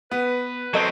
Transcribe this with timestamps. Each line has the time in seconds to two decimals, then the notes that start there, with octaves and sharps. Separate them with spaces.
0.11 B3 B4
0.74 F#3 C4 A4 D#5